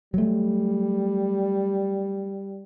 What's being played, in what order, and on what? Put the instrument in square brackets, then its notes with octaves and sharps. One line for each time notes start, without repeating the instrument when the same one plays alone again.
[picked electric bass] F#3 A3 [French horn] G3